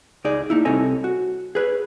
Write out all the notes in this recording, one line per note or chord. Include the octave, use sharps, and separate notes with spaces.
C#2 D#4 G#4 D5
A#3 D#4 E4
C2 C4 A4 C#5 D#5 G#5
F#4
G#4 B4 C#5